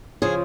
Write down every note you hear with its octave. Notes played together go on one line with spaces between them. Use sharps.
C#3 F3 F4 G#4